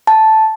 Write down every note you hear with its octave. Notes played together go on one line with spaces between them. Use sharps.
A5